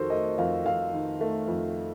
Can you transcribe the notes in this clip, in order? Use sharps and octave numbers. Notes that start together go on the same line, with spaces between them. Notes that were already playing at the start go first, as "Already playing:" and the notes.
Already playing: F2 D#3 F#4 A4 A#4 C5
A3 D#5
F2 F5
F2 F5
D#3
A3
F2